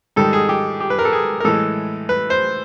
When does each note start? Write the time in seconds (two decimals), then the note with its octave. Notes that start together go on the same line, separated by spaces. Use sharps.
0.16 G#2 D#3 G3 A4
0.33 G#4
0.49 G4
0.80 G4
0.90 B4
0.99 A#4
1.05 A4
1.13 G#4
1.40 A#4
1.45 A2 E3 G#3 A4
2.09 B4
2.30 C5